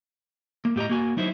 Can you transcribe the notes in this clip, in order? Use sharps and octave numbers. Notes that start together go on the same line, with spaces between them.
A#3
A2 G4 D#5 A#5
A#3 F#4 G#5
F#3 D#4 E4 C5